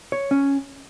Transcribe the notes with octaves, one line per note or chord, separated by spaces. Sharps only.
C#5
C#4